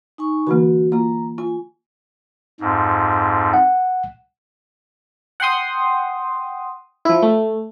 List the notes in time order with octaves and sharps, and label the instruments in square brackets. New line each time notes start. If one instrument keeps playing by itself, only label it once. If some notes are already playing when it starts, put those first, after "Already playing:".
[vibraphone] D#4 G#5 C#6
[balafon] D3 E3 A#3 [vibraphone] F#4
[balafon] A#3 F4 [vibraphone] A#5
[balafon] F4 [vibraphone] G#5
[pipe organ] F2 G#2
[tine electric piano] F#5
[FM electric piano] F#5 G5 C6 D#6
F3 E4
A3